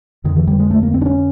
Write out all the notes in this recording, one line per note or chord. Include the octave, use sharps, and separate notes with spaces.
F2 D3 D#3
E3
G3
G#3
A3
A#3
C4
D4
C#4